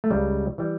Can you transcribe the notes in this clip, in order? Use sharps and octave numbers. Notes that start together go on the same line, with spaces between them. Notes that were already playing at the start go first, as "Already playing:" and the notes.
A3
C#2 C#3 G3
E3 G3